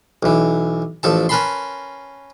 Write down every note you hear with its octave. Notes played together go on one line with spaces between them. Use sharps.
B1 E3
A1 F3 A4 A5
C#4 A#4 B4 A5 B5 C6